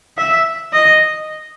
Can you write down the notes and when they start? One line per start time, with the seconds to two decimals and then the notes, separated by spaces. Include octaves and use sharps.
0.18 E5
0.73 D#5